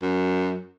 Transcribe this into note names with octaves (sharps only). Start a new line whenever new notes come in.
F#2